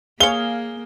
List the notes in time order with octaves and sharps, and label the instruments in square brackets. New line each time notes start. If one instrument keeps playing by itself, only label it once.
[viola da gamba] A#3 [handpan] G#4 [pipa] C#5 F5 [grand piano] G7